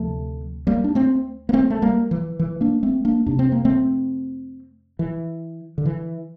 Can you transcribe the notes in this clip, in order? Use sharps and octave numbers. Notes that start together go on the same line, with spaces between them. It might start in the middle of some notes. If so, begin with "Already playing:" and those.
Already playing: D2 C3 F3 A3
G3 A#3
D4
A3 C4
A#3
A3 C4
A3
G3 A#3
E3
E3
A#3 D4
A3 C4
A#3 D4
F2 C3 D4
C4
A#3
A3 C4
E3
D3
E3